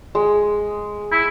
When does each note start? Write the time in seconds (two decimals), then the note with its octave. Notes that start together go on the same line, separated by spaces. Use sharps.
0.15 G#3
1.11 E4